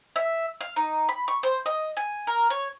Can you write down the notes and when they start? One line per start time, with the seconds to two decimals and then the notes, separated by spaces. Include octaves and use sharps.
0.16 E5
0.61 F5
0.76 D#4
1.09 B5
1.28 C#6
1.43 C5
1.66 D#5
1.97 G#5
2.27 A#4
2.50 C#5